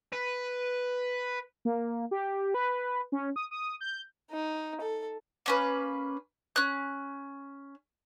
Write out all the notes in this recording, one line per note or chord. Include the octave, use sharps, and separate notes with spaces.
B4
A#3
G4
B4
C#4
D#6
D#6
G6
D#4
A4
A#3 C#4 B4
C#4 F#6